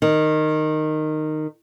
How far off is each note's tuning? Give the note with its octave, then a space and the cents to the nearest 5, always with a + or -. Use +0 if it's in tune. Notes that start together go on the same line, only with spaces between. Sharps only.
D#3 -10